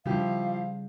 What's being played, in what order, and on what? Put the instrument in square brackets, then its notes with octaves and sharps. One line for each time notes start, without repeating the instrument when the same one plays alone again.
[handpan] C#3 G3 [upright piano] F3 E4 G4 [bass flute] F5